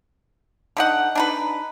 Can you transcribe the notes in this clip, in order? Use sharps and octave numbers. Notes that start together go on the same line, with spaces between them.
D3 D#4 F#5
D4 D#4 B4